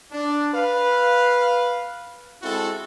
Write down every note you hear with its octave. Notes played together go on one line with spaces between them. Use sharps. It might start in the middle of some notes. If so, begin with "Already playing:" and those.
D4
B4 F5
G#3 C4 E4 F#4 A4